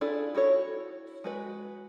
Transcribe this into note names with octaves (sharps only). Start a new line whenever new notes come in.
D4 E4 F4 G#4 A4
E4 F#4 A4 C#5
G#3 F#4 B4